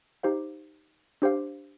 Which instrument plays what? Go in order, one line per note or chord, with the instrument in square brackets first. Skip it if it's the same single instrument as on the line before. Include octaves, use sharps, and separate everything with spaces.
[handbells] D#4 G4 C5 F5
D4 G4 C5 F5